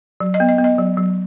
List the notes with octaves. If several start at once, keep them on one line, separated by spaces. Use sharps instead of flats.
F#3
D#5
B3
D#5
B3
D#5
F#3
F#3